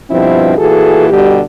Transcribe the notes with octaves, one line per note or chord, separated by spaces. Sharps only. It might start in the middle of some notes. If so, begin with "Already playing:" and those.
G2 B2 F3 C4 E4
A#2 E3 F#4 G#4 A4
B2 D3 G3 G4